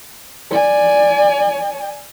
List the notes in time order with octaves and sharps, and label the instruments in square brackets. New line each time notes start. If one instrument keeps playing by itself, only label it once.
[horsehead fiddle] D5 G#5